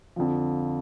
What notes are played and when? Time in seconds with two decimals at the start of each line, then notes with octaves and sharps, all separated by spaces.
0.16 F2 D3 F3